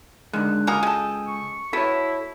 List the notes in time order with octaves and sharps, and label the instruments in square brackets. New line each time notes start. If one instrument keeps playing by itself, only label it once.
[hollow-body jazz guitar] D3 G#3 [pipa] D#3 [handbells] F#6
[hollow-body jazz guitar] C#2 [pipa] A#3 F#4 A#4 [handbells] G#5 D#6
[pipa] G#3 A4 [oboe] G5
[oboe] C#6
[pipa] B3 [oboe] E4 [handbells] F#4 B6 [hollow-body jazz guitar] A4 C#5